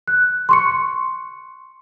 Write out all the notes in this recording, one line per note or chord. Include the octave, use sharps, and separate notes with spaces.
F#6
C6 C#6 C#7